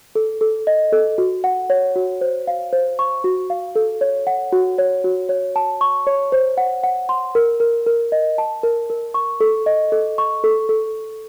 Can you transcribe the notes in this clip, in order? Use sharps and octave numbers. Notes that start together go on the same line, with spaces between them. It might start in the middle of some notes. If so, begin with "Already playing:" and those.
A4
A4
D#5
A4
F#4
F#5
C#5
F#4
C5
F5
C5
C#6
F#4
F5
A4
C#5
F#5
F#4
C#5
F#4
C#5
A5
C#6
C#5
C5
F#5
F#5
C6
A#4
A#4
A#4
D#5
A5
A#4
A#4
C#6
A4
D#5
A4
C#6
A4
A4